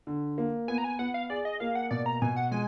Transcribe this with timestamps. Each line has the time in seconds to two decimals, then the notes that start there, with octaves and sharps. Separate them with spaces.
0.07 D3
0.38 A#3
0.68 B3 G#5
0.78 A#5
0.84 G#5
0.99 B3 F#5
1.14 F5
1.30 G#4 D5
1.45 D#5
1.60 A#3 F5
1.75 F#5
1.91 B2 D5
2.06 A#5
2.22 B2 G#5
2.36 F#5
2.51 G#3 G#5